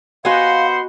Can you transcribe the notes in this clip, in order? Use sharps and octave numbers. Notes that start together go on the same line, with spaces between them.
B3 F#4 C5 D#5 F5 F#5 G#5 C6